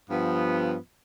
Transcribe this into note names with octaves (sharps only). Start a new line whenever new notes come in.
G2 F3 B3